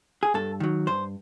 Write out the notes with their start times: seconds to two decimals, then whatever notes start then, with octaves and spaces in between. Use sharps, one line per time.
0.23 G#4
0.34 G2 A4
0.60 D#3 F#3
0.87 G2 C5